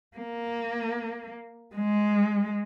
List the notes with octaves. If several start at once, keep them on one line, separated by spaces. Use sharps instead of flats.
A#3
G#3